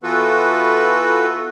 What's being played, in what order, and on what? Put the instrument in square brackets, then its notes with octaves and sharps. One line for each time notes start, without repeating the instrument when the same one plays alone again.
[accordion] E3 B3 F4 F#4 A4 B4